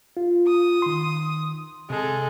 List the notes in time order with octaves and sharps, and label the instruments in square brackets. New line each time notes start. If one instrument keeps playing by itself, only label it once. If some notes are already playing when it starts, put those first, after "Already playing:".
[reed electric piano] F4
[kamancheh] D#6
[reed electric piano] D#3 C6
[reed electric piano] C3 [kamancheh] G#3 A4